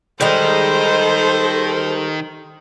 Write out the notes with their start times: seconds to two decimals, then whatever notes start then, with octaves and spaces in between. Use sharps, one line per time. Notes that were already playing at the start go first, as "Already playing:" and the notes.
0.21 D#3 G3 G#3 D#4 A4 C5 D#5